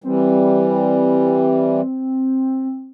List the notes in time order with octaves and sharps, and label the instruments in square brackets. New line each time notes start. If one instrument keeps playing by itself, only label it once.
[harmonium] E3 G3 [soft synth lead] C4